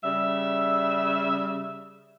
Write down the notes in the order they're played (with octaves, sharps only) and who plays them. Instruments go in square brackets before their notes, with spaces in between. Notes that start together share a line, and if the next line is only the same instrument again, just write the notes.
[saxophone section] C#3 G3 E5